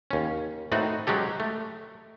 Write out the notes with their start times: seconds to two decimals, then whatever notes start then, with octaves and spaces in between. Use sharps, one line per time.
0.11 D#2 C#4
0.72 A2 A3 C4 D#4 F#4
1.07 F#3 G#3 C#4 G4 A4
1.40 A3